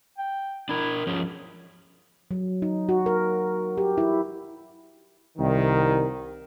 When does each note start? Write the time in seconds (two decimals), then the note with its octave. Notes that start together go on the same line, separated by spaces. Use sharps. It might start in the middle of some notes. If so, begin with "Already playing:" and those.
0.18 G5
0.69 D4 E4 A#4
1.07 F3 C#4 G#4
2.31 F#3
2.62 D#4
2.89 F#4
3.06 A#4
3.78 G4
3.98 E4
5.38 C2 D#3